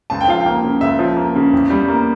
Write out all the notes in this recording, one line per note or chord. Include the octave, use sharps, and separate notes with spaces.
C#2 A5
G5
F3 F5
G5
A#3
C#3
C#2 E5
F3
A#3
C#3
E2
G3
A#3